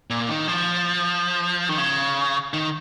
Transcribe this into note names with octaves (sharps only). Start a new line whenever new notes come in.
A#2
D#3
F3
D#3
C#3
D#3